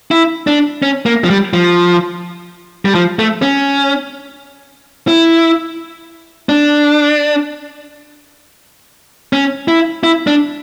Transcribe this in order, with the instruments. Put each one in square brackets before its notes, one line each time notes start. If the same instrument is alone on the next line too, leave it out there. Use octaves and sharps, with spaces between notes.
[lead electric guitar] E4
D4
C#4
A#3
F3
G3
F3
G3
F3
A3
C#4
E4
D4
C#4
E4
E4
D4